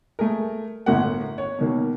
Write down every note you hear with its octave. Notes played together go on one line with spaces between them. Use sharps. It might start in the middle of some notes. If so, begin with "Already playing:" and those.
A3 G#4 A#4
G1 A2 A#4 F#5
C#5
B2 D#3 A#3